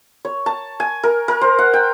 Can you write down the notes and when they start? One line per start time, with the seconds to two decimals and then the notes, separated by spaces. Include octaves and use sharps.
0.25 C#5
0.46 A5
0.80 G#5
1.03 A#4
1.28 A#4
1.41 C5
1.59 F#5
1.74 G5